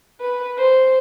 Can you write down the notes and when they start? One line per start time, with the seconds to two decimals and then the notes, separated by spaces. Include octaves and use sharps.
0.19 B4
0.56 C5